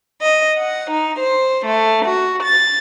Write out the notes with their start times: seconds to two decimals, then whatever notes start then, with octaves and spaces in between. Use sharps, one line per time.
0.20 D#5
0.58 F#5
0.89 D#4
1.19 C5
1.66 A3
2.06 F#4
2.43 A6